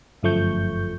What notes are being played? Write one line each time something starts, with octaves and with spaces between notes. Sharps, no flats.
G1 F#2 F3 A3 C#6 G6